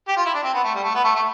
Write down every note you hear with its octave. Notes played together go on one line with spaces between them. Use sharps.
G4
F4
E4
D4
C4
B3
A3
G3
A3
B3
A3
A3